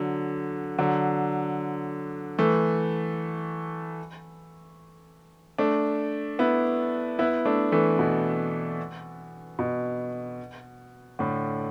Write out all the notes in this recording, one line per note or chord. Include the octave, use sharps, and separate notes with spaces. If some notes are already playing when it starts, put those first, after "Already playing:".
Already playing: D3 F#3
D3 F#3
E3 A3
A3 D4
B3 E4
B3 E4
A3 D4
E3 A3
B2
B2
A2 D3